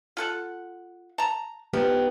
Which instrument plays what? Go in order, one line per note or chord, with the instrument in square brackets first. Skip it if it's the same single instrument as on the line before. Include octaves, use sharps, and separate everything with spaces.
[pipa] F4 A4 F#5
A5 A#5
[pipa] F3 [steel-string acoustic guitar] B3 D#4 G4